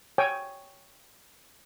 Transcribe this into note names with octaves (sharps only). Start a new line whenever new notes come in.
C#5 G5 G#5